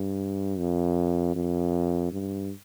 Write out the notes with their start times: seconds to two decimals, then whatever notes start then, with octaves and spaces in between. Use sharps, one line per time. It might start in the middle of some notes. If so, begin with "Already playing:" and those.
Already playing: G2
0.59 F2
1.36 F2
2.12 G2